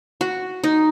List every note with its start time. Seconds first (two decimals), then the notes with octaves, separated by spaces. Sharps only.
0.21 F#4
0.64 D#4